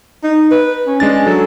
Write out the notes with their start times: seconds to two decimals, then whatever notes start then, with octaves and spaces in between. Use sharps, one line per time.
0.23 D#4
0.51 B4
0.87 C#4
1.00 G#3 D4 A6
1.27 F#3 A4